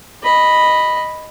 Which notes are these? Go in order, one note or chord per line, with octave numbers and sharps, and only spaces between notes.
D#5 B5